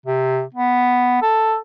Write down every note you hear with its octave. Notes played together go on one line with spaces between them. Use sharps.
C3
B3
A4